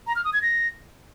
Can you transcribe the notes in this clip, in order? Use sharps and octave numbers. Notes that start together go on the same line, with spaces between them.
A#5
F6
D#6
G#6
A#6